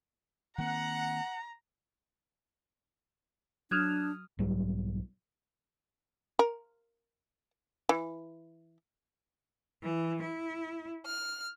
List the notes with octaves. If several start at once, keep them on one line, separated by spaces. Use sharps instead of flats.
D#3 A#3 C4 F#5 A#5
F#3 D4 D#6 F6 F#6 G#6 E7
B1 G#2 F#3 G3
A#4
E3
E3
E4
F6